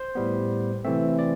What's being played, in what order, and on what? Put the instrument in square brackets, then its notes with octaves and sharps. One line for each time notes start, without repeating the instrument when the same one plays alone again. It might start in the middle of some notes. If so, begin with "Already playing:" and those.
Already playing: [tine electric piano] C5
A2 G3 B3
C3 E3 A3 C4 E5
D5